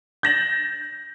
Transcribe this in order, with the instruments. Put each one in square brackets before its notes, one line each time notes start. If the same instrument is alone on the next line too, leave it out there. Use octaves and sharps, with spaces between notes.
[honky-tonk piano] G6 A6 A#6 E7 F#7